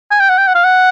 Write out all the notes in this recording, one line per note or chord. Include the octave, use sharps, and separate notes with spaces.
G#5
G5
F#5
G5
F#5
F5
F#5